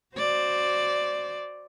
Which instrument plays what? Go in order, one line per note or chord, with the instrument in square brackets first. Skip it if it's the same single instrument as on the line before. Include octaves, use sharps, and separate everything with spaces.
[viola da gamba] F#4 C5 D5